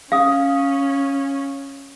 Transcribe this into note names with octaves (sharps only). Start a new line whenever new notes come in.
C#4 F5 D#6